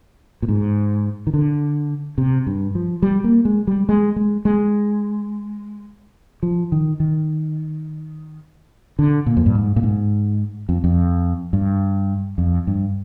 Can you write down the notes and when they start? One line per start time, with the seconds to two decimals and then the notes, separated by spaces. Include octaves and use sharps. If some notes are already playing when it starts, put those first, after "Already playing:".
0.42 A#2
0.49 G#2
1.27 D#3
1.34 D3
2.18 C3
2.47 G2
2.75 F3
3.02 G3
3.24 A#3
3.45 G#3
3.67 G3
3.89 G#3
4.16 G#3
4.45 G#3
6.43 F3
6.72 D#3
7.00 D#3
8.99 D3
9.26 A#2
9.37 F2
9.46 G2
9.55 G#2
9.76 A#2
9.83 G#2
10.69 F2
10.84 F2
11.53 G2
12.38 F2
12.67 G2